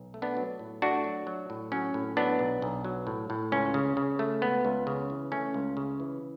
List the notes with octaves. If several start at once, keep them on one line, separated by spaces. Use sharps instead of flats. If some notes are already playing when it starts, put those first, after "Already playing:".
Already playing: B1
A3
B3 D4
F#3
A2
A3 D4 F#4
F#3
F#3
A2
F#3 C#4
A2
F#3 B3 D4
B1
B1
F#3
A2
A2
C#2 C#4
C#3
C#3
A3
C#2 B3
C#2
C#3
E3
A3 C#4
C#2
C#3
E3